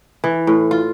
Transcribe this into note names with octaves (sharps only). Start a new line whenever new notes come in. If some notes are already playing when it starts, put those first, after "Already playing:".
E3
A2
F4